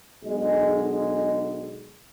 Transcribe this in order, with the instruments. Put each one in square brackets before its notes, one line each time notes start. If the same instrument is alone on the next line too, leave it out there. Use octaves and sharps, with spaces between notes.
[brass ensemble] B1 D3 G#3